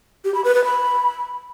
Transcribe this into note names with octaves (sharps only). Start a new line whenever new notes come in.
G4
B5
B4
B4
B5